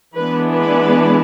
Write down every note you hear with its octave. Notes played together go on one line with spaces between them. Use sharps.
E3 G#3 B3 D4 B4
B4